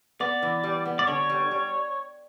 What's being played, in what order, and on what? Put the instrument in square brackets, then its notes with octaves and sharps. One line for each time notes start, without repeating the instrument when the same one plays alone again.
[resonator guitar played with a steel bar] B3 [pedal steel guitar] D5
[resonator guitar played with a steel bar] E3
G3
B3
[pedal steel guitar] D5
[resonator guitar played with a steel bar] D3 [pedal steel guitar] C#5
[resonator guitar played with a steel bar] G3
G3